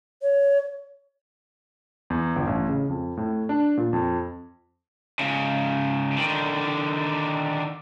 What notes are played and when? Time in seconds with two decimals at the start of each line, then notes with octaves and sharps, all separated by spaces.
0.22 C#5
2.10 E2
2.36 G1
2.47 A1
2.69 C#3
2.89 F2
3.17 A2
3.49 D4
3.77 A#2
3.93 F2
5.19 G#2 C#3
6.19 D3 D#3